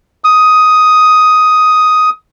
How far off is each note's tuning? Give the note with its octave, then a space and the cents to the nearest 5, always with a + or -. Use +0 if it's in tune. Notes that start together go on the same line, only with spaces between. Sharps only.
D#6 +5